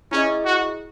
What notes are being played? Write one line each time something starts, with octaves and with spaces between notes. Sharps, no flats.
C#4 E4 G#4 D#5
F#4